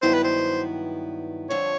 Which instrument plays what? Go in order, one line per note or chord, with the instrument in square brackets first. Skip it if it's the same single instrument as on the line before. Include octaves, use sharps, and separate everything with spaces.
[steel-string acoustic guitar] G2 D#3 F#3 B3 E4 [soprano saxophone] C5
[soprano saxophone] B4
C5
[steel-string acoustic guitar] F2 D3 F3 [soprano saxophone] C#5